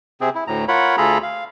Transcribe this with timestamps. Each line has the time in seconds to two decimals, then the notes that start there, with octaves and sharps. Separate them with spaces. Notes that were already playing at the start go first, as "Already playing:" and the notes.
0.21 C3 C4 G#4
0.35 E4
0.47 D2 A2 A#5
0.68 F4 A#4 C#5 F#5 B5
0.98 D2 F4 G#4 A4 A#5 B5
1.23 F5